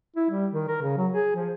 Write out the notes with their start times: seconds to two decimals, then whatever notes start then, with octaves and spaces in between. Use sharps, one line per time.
0.16 E4
0.30 G3
0.53 D#3
0.68 A#4
0.82 C#3
0.97 F#3
1.12 G#4
1.35 F3